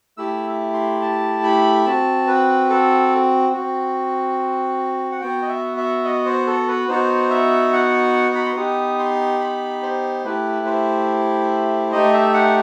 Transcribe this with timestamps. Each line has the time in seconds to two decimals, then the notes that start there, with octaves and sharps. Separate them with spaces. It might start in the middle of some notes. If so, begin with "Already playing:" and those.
0.17 A3 E4 G4 E6
0.74 C6
1.01 A5
1.43 B5
1.85 C4 F#4 A5
2.27 B4
2.70 A4
3.53 C4 F#4
5.12 F#5
5.21 B3 F#4 G5
5.42 D#5
5.48 E5
5.77 E5
6.05 D#5
6.26 C5
6.47 A4
6.68 B4
6.88 B3 D#4 F#4 C5
7.30 E5
7.73 F#5
8.35 B5
8.45 C6
8.56 B3 D#4 G4 D#6
8.99 C6
9.40 B5
9.83 C5
10.24 A3 E4 G4 B4
10.66 C5
11.92 A3 D#4 G4 D#5
12.13 E5
12.34 F#5